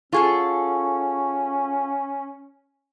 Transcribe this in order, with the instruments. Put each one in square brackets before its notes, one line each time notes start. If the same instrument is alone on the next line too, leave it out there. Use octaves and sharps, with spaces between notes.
[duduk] C#4 [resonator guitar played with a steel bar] F4 G#4 A4 [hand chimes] F5 F#5 C#6